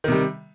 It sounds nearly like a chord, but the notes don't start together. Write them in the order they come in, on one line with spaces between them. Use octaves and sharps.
D#3 C3 G3